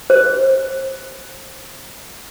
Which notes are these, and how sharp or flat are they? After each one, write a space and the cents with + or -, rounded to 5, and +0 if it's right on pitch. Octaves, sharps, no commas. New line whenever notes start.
C5 +30